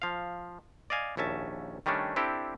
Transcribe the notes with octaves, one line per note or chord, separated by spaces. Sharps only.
F3 F5
D5 D#5 F5 G#5
A#1 D#2 C#4 E5 A5
D#3 G3 A3 C#4 D4
C4 D4 E4 G4 A4